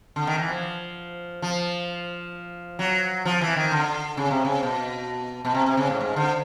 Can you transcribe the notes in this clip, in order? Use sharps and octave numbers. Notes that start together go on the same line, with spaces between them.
D3
D#3
E3
F3
F3
F#3
F3
E3
D#3
D3
C#3
C3
C#3
B2
B2
C3
C3
C#3
A2
G#2
D3